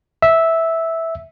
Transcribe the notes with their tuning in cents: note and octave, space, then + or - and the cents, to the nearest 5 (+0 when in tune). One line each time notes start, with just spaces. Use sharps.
E5 -10